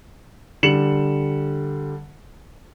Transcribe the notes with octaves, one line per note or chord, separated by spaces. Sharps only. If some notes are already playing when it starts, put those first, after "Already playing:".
D3 G3 C#7 E7 F#7